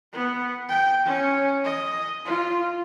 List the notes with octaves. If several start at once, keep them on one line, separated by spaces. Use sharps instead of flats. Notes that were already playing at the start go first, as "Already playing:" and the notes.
B3
G5
C#4
D#5
F4